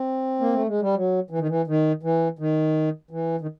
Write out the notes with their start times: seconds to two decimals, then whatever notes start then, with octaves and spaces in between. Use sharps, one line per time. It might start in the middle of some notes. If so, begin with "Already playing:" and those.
Already playing: C4
0.40 A#3
0.53 A3
0.67 G#3
0.81 G3
0.95 F#3
1.30 E3
1.39 D#3
1.48 E3
1.67 D#3
2.03 E3
2.39 D#3
3.11 E3
3.41 D#3